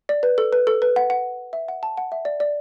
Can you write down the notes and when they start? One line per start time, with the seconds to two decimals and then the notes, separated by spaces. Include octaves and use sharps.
0.09 D5
0.23 B4
0.38 A4
0.53 B4
0.67 A4
0.82 B4
0.96 F#5
1.10 F#5
1.53 E5
1.68 F#5
1.83 A5
1.97 F#5
2.12 E5
2.25 D5
2.40 D5